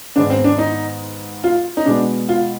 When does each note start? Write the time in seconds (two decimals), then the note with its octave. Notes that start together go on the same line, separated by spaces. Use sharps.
0.16 G#2 D#3 G#3 B3 D4
0.30 C4
0.44 D4
0.58 D#4
1.44 F4
1.77 D#4
1.86 B2 G#3 B3 D4
2.29 F4